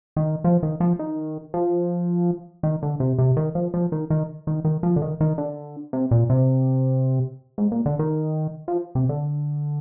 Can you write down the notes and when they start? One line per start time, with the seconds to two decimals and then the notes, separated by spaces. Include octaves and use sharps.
0.16 D#3
0.44 F3
0.63 D#3
0.80 F3
0.99 D#3
1.54 F3
2.63 D#3
2.83 D3
3.00 C3
3.18 C3
3.37 D#3
3.55 F3
3.74 F3
3.92 D#3
4.10 D#3
4.47 D#3
4.65 D#3
4.83 F3
4.96 D3
5.02 D#3
5.20 D#3
5.38 D3
5.93 C3
6.11 A#2
6.30 C3
7.58 G#2
7.72 A#2
7.86 D3
7.99 D#3
8.68 F3
8.95 C3
9.09 D3